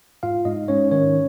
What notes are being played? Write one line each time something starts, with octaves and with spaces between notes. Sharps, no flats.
G#2 F4 F5
G#2 D#4 D#5
G#2 C#4 C#5
D#3 C#4 C#5